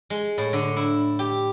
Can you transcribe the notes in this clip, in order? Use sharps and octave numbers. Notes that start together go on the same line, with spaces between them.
G#3
A2
D3
E4
G4